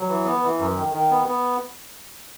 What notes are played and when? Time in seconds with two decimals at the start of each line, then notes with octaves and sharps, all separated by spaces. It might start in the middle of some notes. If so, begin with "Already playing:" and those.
Already playing: F#3
0.08 E3
0.25 B3
0.43 E3
0.59 F#2
0.76 D#3
0.94 D#3
1.11 B3
1.27 B3